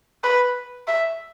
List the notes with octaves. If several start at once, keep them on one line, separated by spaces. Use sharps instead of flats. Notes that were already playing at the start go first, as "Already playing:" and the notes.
B4
E5